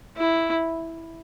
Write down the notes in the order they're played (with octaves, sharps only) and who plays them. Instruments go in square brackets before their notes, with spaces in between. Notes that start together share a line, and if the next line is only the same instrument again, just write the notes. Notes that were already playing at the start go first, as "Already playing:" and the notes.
[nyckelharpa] E4